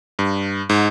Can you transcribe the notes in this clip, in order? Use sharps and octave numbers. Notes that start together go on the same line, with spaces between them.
G2
G#2